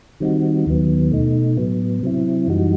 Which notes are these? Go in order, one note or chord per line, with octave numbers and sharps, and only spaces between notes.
D#3 G3 C4 D#4 F#4
D#2 D#3 F#3 B3
B2 A3 D#4
A2 F#3 B3
C3 F#3 C4 E4
F#2 E3 G3 D#4 F#4